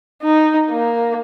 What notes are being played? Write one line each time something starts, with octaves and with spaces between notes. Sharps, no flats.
D#4
A#3